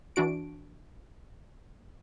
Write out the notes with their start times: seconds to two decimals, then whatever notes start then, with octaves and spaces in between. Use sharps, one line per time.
0.16 E3 D4 F#4 D7